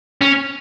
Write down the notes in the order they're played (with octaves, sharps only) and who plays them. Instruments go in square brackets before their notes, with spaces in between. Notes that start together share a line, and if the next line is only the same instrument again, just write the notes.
[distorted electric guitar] C#4